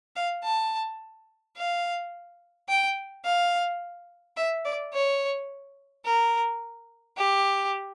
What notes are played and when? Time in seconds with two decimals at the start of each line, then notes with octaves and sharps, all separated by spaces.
0.16 F5
0.44 A5
1.57 F5
2.69 G5
3.25 F5
4.37 E5
4.65 D5
4.93 C#5
6.05 A#4
7.17 G4